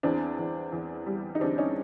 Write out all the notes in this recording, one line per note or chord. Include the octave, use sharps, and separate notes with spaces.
E2 C4 D4
E2
E2
G3
D#4
E2 C4 D4
C#4 D#4